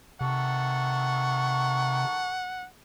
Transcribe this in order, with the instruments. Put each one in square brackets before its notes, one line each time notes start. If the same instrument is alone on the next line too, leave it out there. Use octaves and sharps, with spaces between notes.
[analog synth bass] C3 [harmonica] D#3 A4 C#6 [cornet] F#5